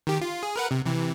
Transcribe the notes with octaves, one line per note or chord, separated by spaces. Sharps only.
D#3 G4
F4
G#4
A#4 B4 F#5
C3
C3 E3